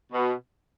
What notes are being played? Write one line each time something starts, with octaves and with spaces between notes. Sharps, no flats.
B2